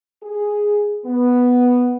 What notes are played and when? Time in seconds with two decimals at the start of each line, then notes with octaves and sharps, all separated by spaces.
0.23 G#4
1.06 B3